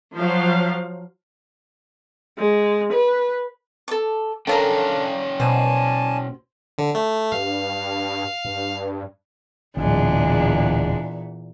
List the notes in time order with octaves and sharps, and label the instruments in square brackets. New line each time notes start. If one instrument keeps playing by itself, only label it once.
[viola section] F3 F#3 C5 F5
[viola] G#3
B4
[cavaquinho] A4 D6
[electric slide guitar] A#3 C#4 G5 [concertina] D4 [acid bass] A4 [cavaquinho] A#4 D5 F5
[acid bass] B2 [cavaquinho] C5 [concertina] D5 G#5 A5
[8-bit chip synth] D3
A3
[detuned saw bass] G2 [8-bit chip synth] F5
[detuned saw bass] G2
[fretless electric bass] D1 G#1 [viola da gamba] E2 A#2 [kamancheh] G#3 D4